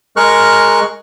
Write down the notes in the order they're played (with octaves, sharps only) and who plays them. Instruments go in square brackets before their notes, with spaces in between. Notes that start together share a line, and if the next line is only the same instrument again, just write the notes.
[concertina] G#3 G#4 A#4 C#6 F6 F#6